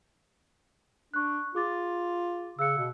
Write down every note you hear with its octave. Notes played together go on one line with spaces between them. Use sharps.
D4 C#6 F#6
F4 G#4 D6 A6
C#3 E6 F#6 C#7
B2